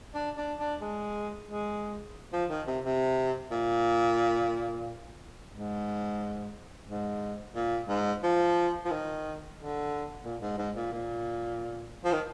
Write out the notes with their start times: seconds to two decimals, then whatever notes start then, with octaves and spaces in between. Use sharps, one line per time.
0.14 D4
0.37 D4
0.59 D4
0.81 G#3
1.49 G#3
2.33 F3
2.50 D#3
2.67 C3
2.84 C3
3.51 A#2
5.53 G#2
6.88 G#2
7.55 A#2
7.88 G#2
8.23 F3
8.85 F3
8.90 D#3
9.58 D3
10.24 A#2
10.41 G#2
10.58 G#2
10.76 A#2
10.92 A#2
12.04 F3
12.12 D#3